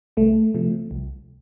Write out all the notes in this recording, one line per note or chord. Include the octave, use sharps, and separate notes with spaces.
C2 A3
C3 F3 A3
C2